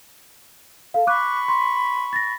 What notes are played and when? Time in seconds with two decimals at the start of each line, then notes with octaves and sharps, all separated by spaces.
0.94 A4 F5
1.07 B5 C#6 D6 F#6
1.48 C6
2.13 A6 A#6